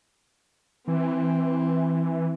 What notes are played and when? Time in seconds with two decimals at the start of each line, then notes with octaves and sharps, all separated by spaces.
0.88 E3 C4